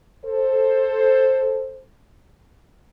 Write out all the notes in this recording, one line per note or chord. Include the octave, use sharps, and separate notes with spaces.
A4 C5